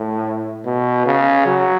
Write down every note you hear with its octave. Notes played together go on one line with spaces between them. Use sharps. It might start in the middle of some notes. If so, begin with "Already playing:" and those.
Already playing: A2
B2
C#3
F#3